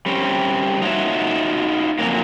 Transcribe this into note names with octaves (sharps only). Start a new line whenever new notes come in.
G3 C4 C#4
D#4 F4 F#4 C#5 E5
F2 A#2 F#3 A#3